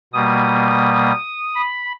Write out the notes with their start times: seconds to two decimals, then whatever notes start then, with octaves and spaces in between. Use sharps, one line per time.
0.13 B2 G3 A#3 D#6
1.55 B5